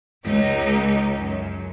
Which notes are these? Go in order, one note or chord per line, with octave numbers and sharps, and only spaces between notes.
C#2 D#4
F#2